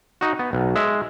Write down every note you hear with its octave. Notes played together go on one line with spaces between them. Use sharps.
D#4 F#4
B3
B1
G#3 E5